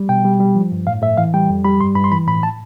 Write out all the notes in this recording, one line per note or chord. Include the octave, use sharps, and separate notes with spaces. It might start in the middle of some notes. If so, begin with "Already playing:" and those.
Already playing: G3
B2 G5
G3
G3
F3
G2
A2 F5
A2 E5
E3 F5
G3 G5
F2
G3 B5
G2 C6
G2 B5
C6
E3 B5
A2 B5
A5